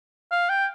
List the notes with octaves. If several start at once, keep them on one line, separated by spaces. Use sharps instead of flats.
F5
G5